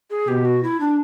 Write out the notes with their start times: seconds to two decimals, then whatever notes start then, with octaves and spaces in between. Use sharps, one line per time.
0.10 G#4
0.28 B2 G4
0.45 F#4
0.63 E4
0.80 D4